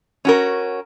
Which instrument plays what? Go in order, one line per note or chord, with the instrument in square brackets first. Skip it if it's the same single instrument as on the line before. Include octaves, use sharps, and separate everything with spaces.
[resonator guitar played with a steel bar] C#4 F#4 A#4